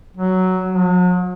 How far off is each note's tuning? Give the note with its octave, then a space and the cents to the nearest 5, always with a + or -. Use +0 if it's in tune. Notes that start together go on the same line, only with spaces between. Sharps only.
F#3 +10
F#3 -45